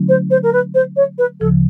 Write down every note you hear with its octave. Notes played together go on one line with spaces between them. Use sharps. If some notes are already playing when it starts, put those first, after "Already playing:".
Already playing: D3 F#3 A3 C#4 E4
C5
C5
A#4
B4
C5
C#5
B4
D2 C#3 F3 A4